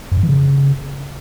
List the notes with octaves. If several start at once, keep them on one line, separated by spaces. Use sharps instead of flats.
F#2
G2
E3
C#3